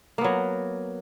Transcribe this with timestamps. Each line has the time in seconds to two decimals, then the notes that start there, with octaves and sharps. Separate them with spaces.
0.18 A#3
0.21 B3
0.24 F#3